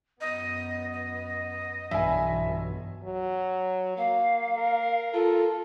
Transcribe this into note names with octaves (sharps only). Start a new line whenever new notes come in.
F#2 B3 D#5
D#5
B1 G2 E3 E5 G#5
F#3
A#3 F5
A#4
F4 A4